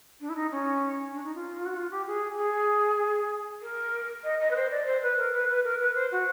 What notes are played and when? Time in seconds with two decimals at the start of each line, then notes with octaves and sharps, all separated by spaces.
0.20 D4
0.29 E4
0.36 D#4
0.51 C#4
1.13 D4
1.24 D#4
1.34 F4
1.65 F#4
1.76 F4
1.91 G4
2.06 G#4
2.37 G#4
3.62 A#4
4.24 D#5
4.40 D#5
4.50 B4
4.55 C5
4.70 D5
4.86 C5
5.02 B4
5.18 A#4
5.34 B4
5.49 B4
5.64 A#4
5.80 B4
5.95 C5
6.11 F#4